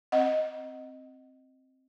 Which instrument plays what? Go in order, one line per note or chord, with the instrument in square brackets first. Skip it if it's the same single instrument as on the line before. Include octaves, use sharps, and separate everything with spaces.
[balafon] C4 D#5 F#5